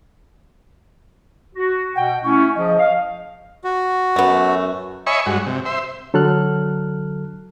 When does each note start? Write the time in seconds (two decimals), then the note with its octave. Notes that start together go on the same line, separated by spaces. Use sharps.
1.55 F#4
1.96 B2 F#5 G5
2.24 A3 C#4 E4 C#6
2.55 C#3 F3 D#5
2.79 F5
3.64 F#4
4.16 F#2 A3 B3
5.07 C#5 D#5 E5 G#5 B5 C#6
5.26 G2 G#3 F#4
5.46 C3
5.66 C5 E5
6.14 D3 F#3 A4 F6 F#6